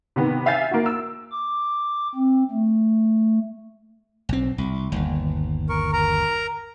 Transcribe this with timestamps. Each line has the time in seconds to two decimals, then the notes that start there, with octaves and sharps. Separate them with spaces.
0.16 C3 D#3 B3
0.46 E5 F5 G#5 G6 A6 C7
0.71 A#3 F#4
0.86 E6
1.31 D6
2.15 C4
2.51 A3
4.29 B1 C4
4.58 C2
4.92 G1 D#2
5.69 A#4 C#6
5.93 A#4 A#5